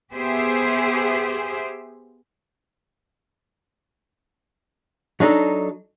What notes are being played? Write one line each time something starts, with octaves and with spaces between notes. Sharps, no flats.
B3 G4 G#4 C5 E5
F#3 D4 D#4 G#4 A4